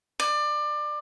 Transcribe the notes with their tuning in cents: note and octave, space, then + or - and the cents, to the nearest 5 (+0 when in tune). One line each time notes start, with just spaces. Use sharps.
D5 +25